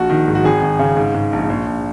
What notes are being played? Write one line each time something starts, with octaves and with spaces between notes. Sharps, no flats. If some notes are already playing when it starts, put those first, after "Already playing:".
Already playing: A#1 F#4
D#3
G#2
F#4
G#1 G#4
G#1
C#3
G#2
G#2
A#1
A#1
A#1